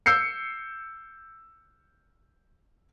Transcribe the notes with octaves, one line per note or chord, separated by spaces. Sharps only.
E6 G6 C7 C#7